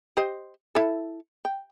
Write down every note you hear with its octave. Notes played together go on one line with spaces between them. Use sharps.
G4 C5 D#5
E4 A4
G5